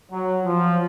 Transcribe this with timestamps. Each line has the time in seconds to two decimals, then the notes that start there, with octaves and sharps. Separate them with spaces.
0.12 F#3
0.44 F3